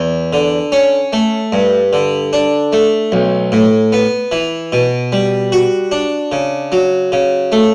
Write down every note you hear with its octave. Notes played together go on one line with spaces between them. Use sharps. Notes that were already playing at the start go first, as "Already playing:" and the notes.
Already playing: E2
D3
C#4
A3
G2
D3
D4
A3
B1
A2
B3
E3
B2
G3
F#4
D4
C#3
F#3
C#3
A3